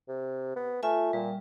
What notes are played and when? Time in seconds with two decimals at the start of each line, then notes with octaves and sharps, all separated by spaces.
0.08 C3
0.56 B3
0.83 A3 F4 E5 G#5
1.13 A#2 G3